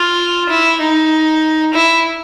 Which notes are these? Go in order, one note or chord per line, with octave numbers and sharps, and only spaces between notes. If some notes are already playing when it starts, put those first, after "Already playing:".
Already playing: F4
E4
D#4
E4